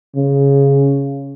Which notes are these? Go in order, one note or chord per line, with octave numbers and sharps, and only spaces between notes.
C#3